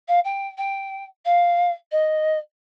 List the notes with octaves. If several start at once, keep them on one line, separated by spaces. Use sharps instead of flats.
F5
G5
G5
F5
D#5